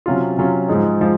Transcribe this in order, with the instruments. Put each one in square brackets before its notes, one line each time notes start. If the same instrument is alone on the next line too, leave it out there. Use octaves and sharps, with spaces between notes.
[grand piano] C3 F#3 C#4 F4
C3 F#3 C#4 F4
G#2 F3 G#3 D#4
F3 G#3